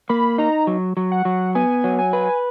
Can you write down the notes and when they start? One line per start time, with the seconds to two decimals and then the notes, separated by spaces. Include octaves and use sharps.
0.09 A#3 B5
0.38 D#4 A#5
0.67 F#3
0.97 F#3
1.12 F#5
1.25 F#3
1.55 B3 G#5
1.84 F#3
1.99 G#5
2.13 B4